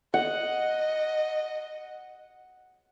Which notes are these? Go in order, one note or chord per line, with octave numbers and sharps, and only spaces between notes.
D#5 F#5